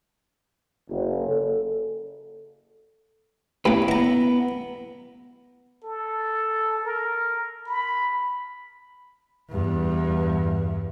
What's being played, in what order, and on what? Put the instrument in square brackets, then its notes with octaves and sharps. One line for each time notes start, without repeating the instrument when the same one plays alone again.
[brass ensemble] F#1
A4
[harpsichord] A2 A#3 [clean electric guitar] C#4 G4 B4
[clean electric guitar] B3 [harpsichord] E4 A#5
[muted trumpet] A4
A#4
B5
[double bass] E2 G2